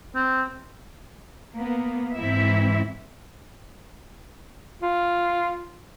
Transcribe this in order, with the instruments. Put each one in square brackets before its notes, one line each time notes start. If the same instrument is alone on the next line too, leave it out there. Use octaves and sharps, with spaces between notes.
[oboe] C4
[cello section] A#3 B3
G#2 E3 C4 E4 E5
[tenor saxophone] F4